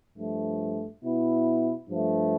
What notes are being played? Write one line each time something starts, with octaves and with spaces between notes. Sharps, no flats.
G2 F3 A3
B2 B3 E4
G2 F3 A3